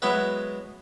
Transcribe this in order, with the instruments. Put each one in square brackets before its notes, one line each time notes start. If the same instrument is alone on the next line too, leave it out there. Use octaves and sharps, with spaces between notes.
[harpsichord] F#3 G#3 B3 E4 E5